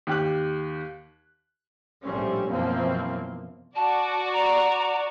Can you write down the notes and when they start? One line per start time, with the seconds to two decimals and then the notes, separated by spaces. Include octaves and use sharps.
0.07 D#2 G4 F#6
2.03 A#1 A2 G3 C4 C#4
2.50 F#2 B2 E3 F3 A#3 C4
3.76 F#4 D5 A5
4.33 A#5